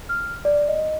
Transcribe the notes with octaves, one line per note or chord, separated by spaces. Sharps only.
F6
D5
D#5